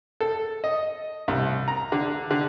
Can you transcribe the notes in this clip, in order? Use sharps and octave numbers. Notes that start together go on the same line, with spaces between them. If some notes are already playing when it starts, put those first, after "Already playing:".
A4
D#5
C2
A#5
D3
D3